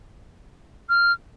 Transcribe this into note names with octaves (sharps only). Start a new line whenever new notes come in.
F6